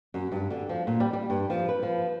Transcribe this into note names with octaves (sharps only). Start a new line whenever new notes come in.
F#2
G2
D3
F3
A#2
G3
G3
G2
F3
B4
F3